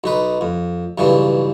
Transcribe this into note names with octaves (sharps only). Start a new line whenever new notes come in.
B1 D#4 B4
F2
B1 G2 C#3 E3